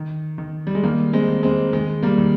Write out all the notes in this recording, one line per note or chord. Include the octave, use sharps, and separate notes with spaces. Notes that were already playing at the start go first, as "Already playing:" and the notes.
Already playing: D#3
D#3
G3
G#3
D#3 G3 A#3
G#3 C4
D#3
G#3 C4
D#3 G#3
G3 A#3
D#3